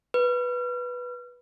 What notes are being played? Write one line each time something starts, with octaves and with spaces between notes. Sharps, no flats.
B4